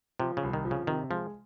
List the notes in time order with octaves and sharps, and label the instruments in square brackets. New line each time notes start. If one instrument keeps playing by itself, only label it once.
[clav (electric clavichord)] C3 [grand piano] F3
[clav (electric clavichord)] C#3
[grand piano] C2
[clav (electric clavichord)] D#3
[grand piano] F3
[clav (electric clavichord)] C#3
[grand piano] C3 [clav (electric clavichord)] D#3
[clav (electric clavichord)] F3 [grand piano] G#3